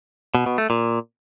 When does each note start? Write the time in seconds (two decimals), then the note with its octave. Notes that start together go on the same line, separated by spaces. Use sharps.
0.35 B2
0.46 B2
0.58 A3
0.70 A#2